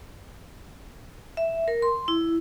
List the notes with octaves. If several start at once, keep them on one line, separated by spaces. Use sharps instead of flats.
E5
A#4
C6
E4